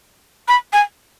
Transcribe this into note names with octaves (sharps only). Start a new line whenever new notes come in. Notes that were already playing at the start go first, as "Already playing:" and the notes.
B5
G#5